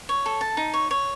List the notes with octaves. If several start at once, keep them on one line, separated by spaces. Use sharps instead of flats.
C#5
A4
A5
D#4
C#5
C#5